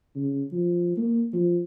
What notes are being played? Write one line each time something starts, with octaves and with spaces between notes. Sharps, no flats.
C#3
F3
A#3
F3